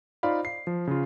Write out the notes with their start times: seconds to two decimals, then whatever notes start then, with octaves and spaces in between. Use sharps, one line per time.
0.23 D#4 F4 C5 D5 F5 B5
0.45 C7
0.67 F3
0.87 C#3 F4